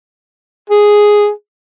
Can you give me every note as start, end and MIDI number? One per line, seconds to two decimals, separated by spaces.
0.70 1.30 68